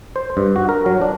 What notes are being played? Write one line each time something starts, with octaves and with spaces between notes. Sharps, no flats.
C5
G2
F#4
A#4
F#3
D4